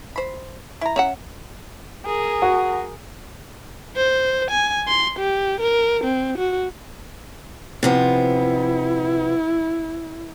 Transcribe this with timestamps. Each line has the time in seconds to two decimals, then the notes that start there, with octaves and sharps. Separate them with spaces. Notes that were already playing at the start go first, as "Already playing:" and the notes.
0.16 C5 B5
0.81 E4 A#5
0.96 C#4 E5 F#5
2.05 G#4 A#4
2.42 F#4
3.96 C5
4.51 G#5
4.88 C6
5.19 G4
5.60 A#4
6.04 C4
6.38 F#4
7.83 C3 F3 B3 E4